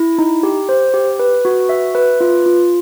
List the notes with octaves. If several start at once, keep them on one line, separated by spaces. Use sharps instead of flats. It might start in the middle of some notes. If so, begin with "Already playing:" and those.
Already playing: E4
D#4
G4
C5
G4
B4
F#4
E5
B4
F4
F4